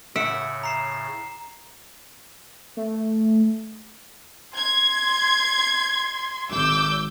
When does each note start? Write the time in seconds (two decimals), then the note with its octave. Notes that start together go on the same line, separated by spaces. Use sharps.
0.16 A2 C#3 E5 F#5 C#7 D7
0.63 A#5 C7 E7
2.77 A3
4.56 C6 G#6
6.52 G#1 D6 E6 G6